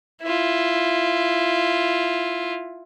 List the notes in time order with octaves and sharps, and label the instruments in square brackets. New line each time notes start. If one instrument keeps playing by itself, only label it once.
[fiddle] E4 F4